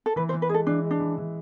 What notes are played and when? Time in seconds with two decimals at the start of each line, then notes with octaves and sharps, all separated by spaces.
0.06 A4
0.16 E3 B4
0.29 C5
0.33 E3
0.42 B4
0.49 G#3 G#4 A4
0.67 E3 D4
0.84 G#3
0.91 D4
1.00 E3
1.18 E3